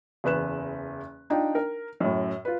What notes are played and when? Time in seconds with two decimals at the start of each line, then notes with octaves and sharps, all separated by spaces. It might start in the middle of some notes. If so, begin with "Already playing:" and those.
0.24 F#1 E2 B4 F#6 E7
1.30 D4 D#4 F4 D5 G5
1.55 A#4
2.00 F#2 A2
2.45 F4 B4